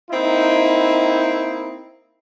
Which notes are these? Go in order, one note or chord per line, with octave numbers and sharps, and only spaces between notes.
A#3 C4 D#4 E4